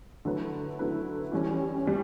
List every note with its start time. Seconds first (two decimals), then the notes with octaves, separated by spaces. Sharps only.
0.25 D3 F#3 A3 E4 B4
0.79 D3 F#3 A3 E4 B4
1.32 E3 G3 C#4
1.86 G3 C#4